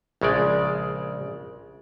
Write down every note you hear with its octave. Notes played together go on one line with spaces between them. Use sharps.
A#1 C#3 G#3 D5